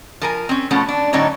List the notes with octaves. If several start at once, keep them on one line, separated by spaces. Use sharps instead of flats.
F3 A#4 G#5
C4 C#4
B2 F3 A3 C#4 F#5
D4
A2 D3 F#3 C#4 D#4